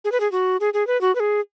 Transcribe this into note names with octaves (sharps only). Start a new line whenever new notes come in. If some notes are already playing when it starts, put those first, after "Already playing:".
G#4
B4
G#4
F#4
G#4
G#4
B4
F#4
B4
G#4